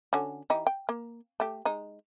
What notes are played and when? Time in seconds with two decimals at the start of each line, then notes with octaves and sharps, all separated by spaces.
0.13 D3 C#4 F#4
0.50 E3 D#4 G4
0.67 G5
0.89 A#3
1.40 A3 G4
1.65 G#3 D#4